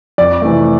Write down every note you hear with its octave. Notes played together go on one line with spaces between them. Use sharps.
F2 D5
C3 E3 A3